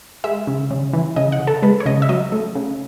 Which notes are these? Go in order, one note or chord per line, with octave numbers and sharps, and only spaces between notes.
G#3 E5
C#3
C#3
E3
C#3 D#5
F#5
C#3
A4
G#3 B4
C#5
C#3 D#5
E5
F#3 D#5
A3
C#3